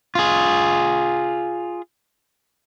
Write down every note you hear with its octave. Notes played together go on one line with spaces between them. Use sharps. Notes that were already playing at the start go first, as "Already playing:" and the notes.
F4 G#4